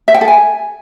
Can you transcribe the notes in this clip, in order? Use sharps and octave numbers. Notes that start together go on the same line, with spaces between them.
E5
G5
A4
G#5